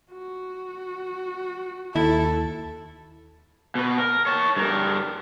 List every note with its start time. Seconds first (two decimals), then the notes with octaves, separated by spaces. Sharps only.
0.12 F#4
1.95 D#2 E4 A4
3.75 B2 B4
3.99 A#4
4.26 C#5 A5
4.57 G2 A#4